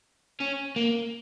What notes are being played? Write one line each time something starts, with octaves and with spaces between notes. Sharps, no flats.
C#4
A#3